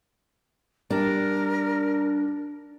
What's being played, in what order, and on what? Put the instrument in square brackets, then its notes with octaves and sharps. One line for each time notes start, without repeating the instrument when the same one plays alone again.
[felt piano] G3 [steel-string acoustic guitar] D4 [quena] A#4